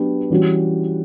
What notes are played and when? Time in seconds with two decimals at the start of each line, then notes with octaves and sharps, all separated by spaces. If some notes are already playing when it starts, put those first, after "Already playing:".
Already playing: F#3 B3 D4 G4 B4
0.30 E3 G3 C#4 F#4